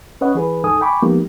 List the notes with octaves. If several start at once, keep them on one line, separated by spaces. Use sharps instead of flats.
C#4 B4 C#5 D#5 F#5
E3 G#4 B4
D#2 G#2 D#4 A4 G#5 D#6
G5 G#5 B5 C#6 D6
F3 G#3 A#3 B3 D#4 G4